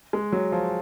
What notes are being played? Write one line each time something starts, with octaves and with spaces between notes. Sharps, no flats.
G#3
F#3
F3